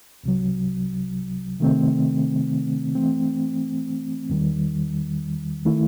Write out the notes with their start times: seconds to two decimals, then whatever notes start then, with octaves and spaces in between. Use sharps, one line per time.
0.24 C2 C3 F#3
1.60 C3 D#3 A3 C4
2.95 E3 A3 C4
4.30 E2 D#3 G3
5.65 D#3 A3 E4